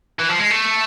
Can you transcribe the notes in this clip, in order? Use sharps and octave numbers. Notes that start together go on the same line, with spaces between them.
E3
F3
G#3
A3